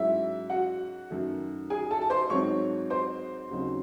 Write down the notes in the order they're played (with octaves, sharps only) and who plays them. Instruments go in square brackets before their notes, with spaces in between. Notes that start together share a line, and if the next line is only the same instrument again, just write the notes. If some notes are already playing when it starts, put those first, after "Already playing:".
Already playing: [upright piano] G#2 F#3 C#4 E4 E5
F#4 F#5
F#2 D#3 A3
G#4 G#5
A4 A5
A5
C5 C6
G#2 F#3 C4 D#4 C#5 C#6
C5 C6
D#2 C#3 F#3 C4 D#4